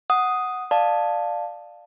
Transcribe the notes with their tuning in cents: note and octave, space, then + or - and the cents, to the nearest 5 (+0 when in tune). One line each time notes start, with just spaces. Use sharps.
F#5 +0 D#6 +0
D5 +15 F5 +10 A5 +0